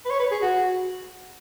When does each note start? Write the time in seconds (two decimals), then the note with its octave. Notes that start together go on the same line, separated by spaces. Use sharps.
0.05 B4
0.10 C#5
0.19 B4
0.31 G#4
0.42 F#4